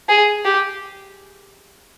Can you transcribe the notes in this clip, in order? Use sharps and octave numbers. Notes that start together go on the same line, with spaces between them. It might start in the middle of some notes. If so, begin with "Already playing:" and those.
G#4
G4